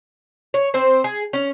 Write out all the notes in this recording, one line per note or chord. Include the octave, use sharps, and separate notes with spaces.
C#5
C4 C5
G#4
C#4